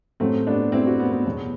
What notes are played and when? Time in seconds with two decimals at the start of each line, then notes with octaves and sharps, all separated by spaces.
0.20 A2 F#3 A3 C4
0.47 B3 D4
0.72 C4 E4
0.86 D4 F#4
0.99 B3
1.12 B3
1.26 E2 B2 F#3